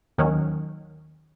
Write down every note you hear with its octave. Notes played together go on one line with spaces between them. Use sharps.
D#2 D#3 F#3 C#4